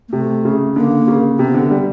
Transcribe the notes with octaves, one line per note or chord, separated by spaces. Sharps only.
A#3
C3 A3
C#3
D3 A#3
C#3
C3 B3
D3
G3